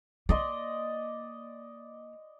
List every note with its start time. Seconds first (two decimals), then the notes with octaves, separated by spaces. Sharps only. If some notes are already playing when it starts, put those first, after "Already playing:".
0.29 A#3 D5 D#5 C6